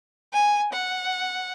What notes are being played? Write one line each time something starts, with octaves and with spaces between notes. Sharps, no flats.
G#5
F#5